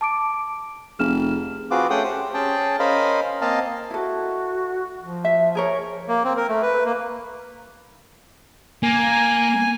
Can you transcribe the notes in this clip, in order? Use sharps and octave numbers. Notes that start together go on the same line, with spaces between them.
A5 D6 D7
F1 G#4 F6 E7
C4 F4 F#4 G#4 B4 D6
A3 C#4 G#4 F#5 G5 D#6
G4 C5
C#4 G#4 G5 A5
C#4 A#4 C5 D#5 F5 B5
A#3 C4 D#5 F5 A5
E4 F#4 A4
F3
E5
G#4 A#4 C#5
A#3
C4
A#4
A3
B4
A#3
A#3 G#5